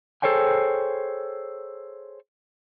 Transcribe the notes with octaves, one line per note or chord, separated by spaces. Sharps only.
G#4 A4 C5 C#5 G5 G#5